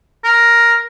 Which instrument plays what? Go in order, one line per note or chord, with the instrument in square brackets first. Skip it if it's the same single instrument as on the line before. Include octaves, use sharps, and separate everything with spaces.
[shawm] A#4